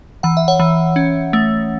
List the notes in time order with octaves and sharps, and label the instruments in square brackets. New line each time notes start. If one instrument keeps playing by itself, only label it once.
[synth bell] E3 F#5
E5
C#5 F#5
E3
C#4
A3